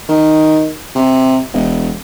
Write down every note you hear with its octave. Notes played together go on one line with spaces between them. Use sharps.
D#3
C3
E1